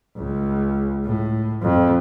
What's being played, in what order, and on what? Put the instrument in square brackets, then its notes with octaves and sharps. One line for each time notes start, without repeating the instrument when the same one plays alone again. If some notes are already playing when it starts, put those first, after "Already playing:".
[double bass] C#2
A2
F2